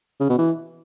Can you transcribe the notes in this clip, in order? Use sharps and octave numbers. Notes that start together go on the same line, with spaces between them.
C#3
B2
E3